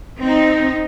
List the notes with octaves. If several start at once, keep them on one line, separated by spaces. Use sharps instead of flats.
C4 D#4